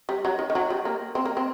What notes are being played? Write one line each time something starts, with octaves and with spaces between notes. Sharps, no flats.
G3
F#3
D#3
D#3
F#3
G3
A#3
C4
A#3
C4